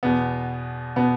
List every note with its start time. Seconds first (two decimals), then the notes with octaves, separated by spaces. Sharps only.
0.03 E2 B2 B3
0.96 B2 B3